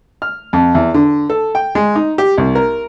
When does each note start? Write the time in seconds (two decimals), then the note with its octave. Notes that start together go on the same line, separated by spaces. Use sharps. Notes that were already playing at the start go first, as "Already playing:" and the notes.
0.22 F6
0.53 F2
0.75 E2
0.94 D3
1.30 A4
1.55 G5
1.75 G#3
1.95 D#4
2.18 G4
2.38 C2
2.55 A#4